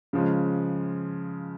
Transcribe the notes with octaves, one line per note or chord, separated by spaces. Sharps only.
C#3 F3 G#3